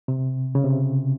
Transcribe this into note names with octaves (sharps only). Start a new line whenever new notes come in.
C3
C#3
C3